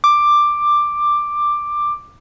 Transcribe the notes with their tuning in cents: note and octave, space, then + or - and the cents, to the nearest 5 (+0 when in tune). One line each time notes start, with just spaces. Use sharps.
D6 +10